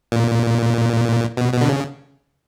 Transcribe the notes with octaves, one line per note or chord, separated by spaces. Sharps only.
A#2
B2
B2
D3
C#3